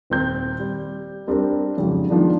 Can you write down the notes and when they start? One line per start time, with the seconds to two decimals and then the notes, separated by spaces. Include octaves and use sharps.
0.10 D#1 C4 G6
0.59 G3
1.27 G3 C4 D4 G4 A#4
1.77 F2 G#2 C#3 F#3
2.10 D#3 F3 G#3 B3 D4